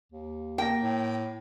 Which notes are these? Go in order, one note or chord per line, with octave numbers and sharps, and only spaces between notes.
D#2
A#3 G5 A#6
A2